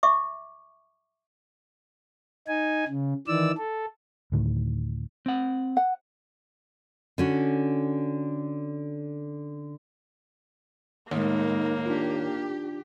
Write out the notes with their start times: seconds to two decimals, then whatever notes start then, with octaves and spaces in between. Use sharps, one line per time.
0.03 E5 C#6 D6
2.48 D#4 G#5
2.87 C#3
3.28 D#3 E3 D5 E6
3.58 A4
4.32 D2 A2 D#3
5.26 C4 F#5
5.77 F#5
7.18 D3 C#4 F#4
11.11 D#2 A2 G#3 A#3 D#4
11.86 D4 F4 G4